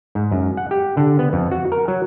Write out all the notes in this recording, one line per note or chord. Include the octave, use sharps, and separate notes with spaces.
G#2
F#2
F#5
G4
D3
B3
F2
F#4
A#4
F#3